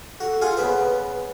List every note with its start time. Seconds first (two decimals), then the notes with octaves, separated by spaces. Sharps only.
0.20 F#4 A4
0.42 F4 G#4 F#5
0.57 C#3 B3 B4 C5